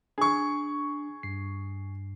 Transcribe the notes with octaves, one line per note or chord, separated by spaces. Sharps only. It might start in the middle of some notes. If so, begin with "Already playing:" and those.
D4 G#4 C#6
G2 C7